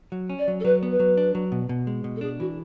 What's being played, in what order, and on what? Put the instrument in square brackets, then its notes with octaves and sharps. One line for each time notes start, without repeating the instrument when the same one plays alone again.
[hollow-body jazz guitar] F#3
C#4
[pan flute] D5
[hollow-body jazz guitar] F#3
[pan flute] A4
[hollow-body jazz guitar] F#3 [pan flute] B4
[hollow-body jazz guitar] B3
[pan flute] B4
[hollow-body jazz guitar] F#3
D4
F#3
B2
B2
G#3
B2
[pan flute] A4
[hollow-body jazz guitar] D4 [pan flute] G#4
[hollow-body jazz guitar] E3 [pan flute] F#4